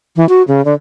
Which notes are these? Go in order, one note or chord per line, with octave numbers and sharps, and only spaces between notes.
E3
F#4
C#3
D3